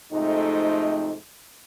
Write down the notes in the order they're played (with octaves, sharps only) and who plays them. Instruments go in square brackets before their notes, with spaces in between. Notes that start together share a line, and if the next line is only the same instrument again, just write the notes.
[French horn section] F2 G#2 C3 A3 D#4